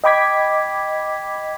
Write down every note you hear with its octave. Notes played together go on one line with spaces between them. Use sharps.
D#5 G5 B5 D6 G#6 B6